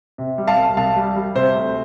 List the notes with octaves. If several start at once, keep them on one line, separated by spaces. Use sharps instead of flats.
C3
G3
F5 A5
C2
C2 F5 A5
G3
G3
C3 C5
D2